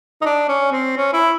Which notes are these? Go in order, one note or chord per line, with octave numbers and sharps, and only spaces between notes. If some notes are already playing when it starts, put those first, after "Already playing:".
D#4
D4
C#4
C4
C#4
E4